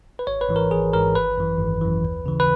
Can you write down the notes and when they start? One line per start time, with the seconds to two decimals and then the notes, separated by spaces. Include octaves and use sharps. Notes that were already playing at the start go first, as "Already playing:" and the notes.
0.19 B4
0.27 G#1 C#5
0.41 B4
0.49 G#2 E3
0.56 A#4
0.71 G#1 G#4
0.93 G#2 E3 A#4
1.15 G#1 B4
1.38 F#2 E3
1.59 G#1
1.81 F#2 E3
2.04 D#2
2.26 C#3 E3
2.40 B4